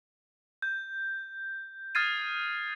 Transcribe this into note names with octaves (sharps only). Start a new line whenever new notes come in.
G6
D#6 F6 G#6 A6 C7 D#7